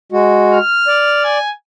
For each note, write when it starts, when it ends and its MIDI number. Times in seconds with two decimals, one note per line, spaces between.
0.12 0.58 56
0.12 0.58 66
0.54 1.22 89
0.88 1.38 74
1.24 1.50 80